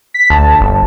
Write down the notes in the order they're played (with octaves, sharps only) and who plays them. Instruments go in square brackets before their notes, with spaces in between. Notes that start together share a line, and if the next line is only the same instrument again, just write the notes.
[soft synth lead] B6
[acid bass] D2 [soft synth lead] A5
[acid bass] G1